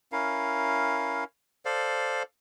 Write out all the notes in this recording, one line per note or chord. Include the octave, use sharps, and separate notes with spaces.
C#4 E4 A#4 F5
A4 C5 D5 F5